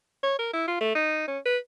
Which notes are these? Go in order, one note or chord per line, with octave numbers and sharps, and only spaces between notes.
C#5
A#4
E4
F4
A3
D#4
C#4
B4